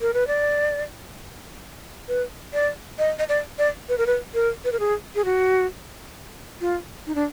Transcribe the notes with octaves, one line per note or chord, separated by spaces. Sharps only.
A#4
B4
D5
B4
D5
D#5
D#5
D5
D5
B4
A#4
B4
A#4
B4
A#4
G#4
G#4
F#4
F4
D#4
D4